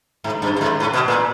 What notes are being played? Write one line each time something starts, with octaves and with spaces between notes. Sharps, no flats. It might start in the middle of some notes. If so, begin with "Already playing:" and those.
G#2
G2
G2
G#2
A2
B2
A#2